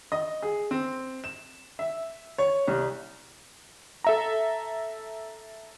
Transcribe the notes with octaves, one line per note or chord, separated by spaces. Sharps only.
D#5
G#4
C4
E7
E5
C#5
C2
A4 E5 A#5